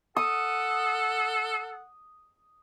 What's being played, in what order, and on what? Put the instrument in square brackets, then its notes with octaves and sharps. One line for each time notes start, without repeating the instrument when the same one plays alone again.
[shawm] A4 [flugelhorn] F#5 [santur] D#6